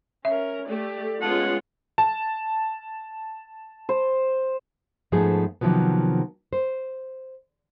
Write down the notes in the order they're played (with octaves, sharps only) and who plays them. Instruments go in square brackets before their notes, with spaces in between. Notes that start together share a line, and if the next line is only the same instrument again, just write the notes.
[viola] C#4 A#4 [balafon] E5
[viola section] A3 [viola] G4 D5
[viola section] G#3 F4 [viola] B3 C#4 [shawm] F#5 [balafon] A5
[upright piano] A5
[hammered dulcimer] C5
[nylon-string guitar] G#2 F3 A3 B3 D#4 G#4
C3 D#3 F3 F#3 B3
C5